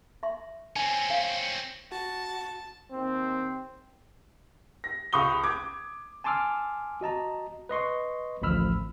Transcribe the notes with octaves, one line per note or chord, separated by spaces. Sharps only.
E5 C6
C4 C#4 G#5
F5
F#4 A5 A6
D#2 C4
A#6
C#2 B5 C#6 D#6 G7
D6 G#6
G#5 A5 C6 D6 E6 F6
F#4 D#5 A5 A#5
B4 D#5 C6 C#6
A1 D2 F3 B5 E6 F6